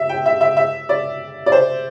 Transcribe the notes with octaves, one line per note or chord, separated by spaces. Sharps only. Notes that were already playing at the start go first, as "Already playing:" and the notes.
Already playing: E5
G5
E5
E5
E5
D5
D5
C5